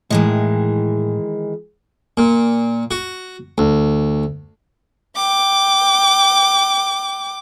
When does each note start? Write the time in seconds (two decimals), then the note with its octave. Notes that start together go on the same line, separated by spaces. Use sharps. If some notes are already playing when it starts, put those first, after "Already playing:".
0.10 A2 D#3 E3 G#3
2.17 A#2
2.91 F#4
3.58 D2
5.16 G5 D6